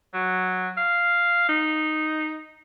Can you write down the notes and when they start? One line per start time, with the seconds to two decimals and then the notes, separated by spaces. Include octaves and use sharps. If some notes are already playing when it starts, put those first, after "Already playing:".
0.14 F#3
0.77 F5
1.49 D#4